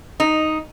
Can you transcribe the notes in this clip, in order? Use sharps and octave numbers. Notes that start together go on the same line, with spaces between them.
D#4